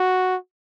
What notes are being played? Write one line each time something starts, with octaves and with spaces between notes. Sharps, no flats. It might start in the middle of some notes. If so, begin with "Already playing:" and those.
Already playing: F#4